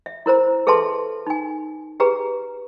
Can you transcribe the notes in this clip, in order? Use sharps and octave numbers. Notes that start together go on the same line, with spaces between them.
E5
E4 A#4 C5 A#5
G#4 A4 B4 E5 A5 C6
D#4 G#5
G4 G#4 B4 A#5